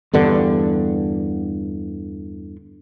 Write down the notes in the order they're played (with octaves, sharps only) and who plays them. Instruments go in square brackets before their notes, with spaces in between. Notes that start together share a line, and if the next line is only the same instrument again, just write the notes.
[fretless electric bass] E2 G2 D3